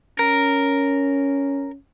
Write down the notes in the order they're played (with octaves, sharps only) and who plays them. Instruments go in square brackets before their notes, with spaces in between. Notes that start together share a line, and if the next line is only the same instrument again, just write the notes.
[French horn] C#4 [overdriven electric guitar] A#4